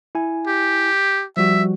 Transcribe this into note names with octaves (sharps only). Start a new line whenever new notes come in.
E4 G#5
G4
F3 G3 F#4 E5